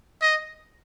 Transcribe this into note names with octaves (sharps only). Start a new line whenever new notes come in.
D#5